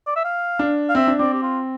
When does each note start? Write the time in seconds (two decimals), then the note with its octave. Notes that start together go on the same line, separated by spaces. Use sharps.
0.07 D5
0.16 E5
0.25 F5
0.59 D4
0.89 F5
0.95 C4 E5
1.08 D4
1.19 C4 D5
1.33 G4
1.42 F4